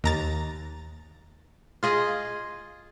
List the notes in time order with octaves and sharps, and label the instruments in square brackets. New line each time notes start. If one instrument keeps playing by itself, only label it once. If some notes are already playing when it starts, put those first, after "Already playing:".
[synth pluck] D#2 A#5 A6
[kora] F4 G#4 D#5